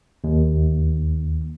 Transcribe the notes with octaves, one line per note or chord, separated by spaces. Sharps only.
D#2